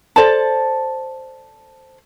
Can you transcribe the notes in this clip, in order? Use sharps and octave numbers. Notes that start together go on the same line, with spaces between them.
A4 C5 D5 A5